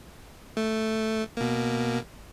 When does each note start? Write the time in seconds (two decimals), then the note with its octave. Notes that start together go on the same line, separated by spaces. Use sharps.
0.57 A3
1.37 B2 A#3